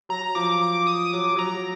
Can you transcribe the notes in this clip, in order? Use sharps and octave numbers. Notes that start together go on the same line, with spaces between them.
F#3 A#5
F3 D6
D6
D#6
F#3 D6
F#3 A#5